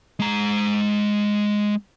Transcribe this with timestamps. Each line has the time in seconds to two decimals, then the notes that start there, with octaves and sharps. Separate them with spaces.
0.20 G#3 A#5